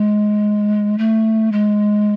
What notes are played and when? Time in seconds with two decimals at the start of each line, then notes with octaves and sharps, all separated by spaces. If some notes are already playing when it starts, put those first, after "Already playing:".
Already playing: G#3
0.98 A3
1.52 G#3